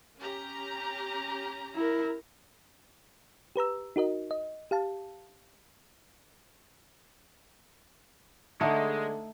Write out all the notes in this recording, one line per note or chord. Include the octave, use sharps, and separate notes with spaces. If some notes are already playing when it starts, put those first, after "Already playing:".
C#4 G4 A#5
E4 A#4
G4 B4 A#5 E6
D#4 F#4 A#4 D#5
D#5
G4 F5 A5
D3 G#3 A3 D#4